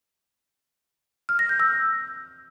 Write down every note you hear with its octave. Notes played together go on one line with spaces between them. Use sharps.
F6
A#6
G6
E6